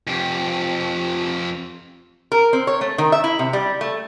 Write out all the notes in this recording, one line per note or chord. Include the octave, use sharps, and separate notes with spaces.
F2 G4
A#4
C4
C#5
A3
D#3
E5
E4
C3
G3
A3